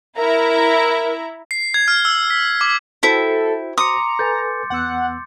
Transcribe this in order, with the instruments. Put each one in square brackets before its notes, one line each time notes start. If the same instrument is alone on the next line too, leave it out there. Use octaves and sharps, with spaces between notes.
[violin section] E4 E5 A#5 [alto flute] A#4
[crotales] C7
G#6
F6
E6
B6
D6
[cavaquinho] E4 G5 [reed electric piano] F#4 C5 [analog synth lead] A4
[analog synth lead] A#5 [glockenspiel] C6 D6 C#7 [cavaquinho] D#6
[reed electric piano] A4 B4 G#5 [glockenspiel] G6 A6
[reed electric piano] E2 B3 E6 [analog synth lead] F#5